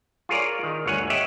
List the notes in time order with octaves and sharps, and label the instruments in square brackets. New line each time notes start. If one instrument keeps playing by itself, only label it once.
[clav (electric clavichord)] F4 G#4 A#4 C#5 D5
D#3
G1 D2 C#5 F#5 G#5
G4 C#5 D#5 E5 F#5